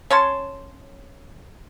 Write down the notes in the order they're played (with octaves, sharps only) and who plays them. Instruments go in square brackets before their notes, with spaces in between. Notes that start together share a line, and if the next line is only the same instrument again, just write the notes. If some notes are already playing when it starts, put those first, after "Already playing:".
[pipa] C#4 C#5 A5 C6